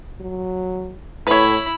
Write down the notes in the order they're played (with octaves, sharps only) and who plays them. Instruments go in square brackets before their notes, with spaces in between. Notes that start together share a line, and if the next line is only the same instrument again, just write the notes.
[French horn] F#3
[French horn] A2 [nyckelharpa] E4 B5 [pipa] B4 C#5